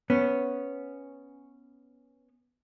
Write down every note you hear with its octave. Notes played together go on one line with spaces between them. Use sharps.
B3 C#4